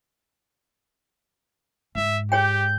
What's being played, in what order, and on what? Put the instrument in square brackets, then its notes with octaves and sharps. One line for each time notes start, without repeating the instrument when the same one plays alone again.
[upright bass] G#2 [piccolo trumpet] E5
[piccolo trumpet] G4 [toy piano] G#4 C#5 G5 [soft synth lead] G6